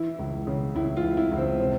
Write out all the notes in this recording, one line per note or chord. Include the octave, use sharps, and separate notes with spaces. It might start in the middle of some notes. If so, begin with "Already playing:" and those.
Already playing: E3 E4
C#2
C#3
C#2 E4
F4
E3
E4
C#2
C4
C3 C4